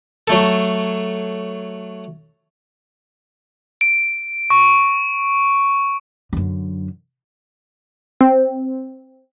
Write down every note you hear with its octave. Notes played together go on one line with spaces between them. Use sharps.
F#3 A3 A4
D7
C#6
F#2 D3
C4